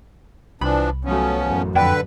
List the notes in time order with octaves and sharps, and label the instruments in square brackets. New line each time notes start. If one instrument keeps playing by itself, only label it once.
[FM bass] C2 [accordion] E3 F3 D4 [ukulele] B5
[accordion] F3 B3 C#4 [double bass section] F#3 A3
[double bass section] A1 F#2
[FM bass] F2 [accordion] D3 B4 [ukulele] D5 F#5 G5